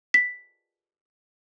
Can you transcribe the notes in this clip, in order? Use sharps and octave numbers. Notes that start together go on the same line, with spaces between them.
B6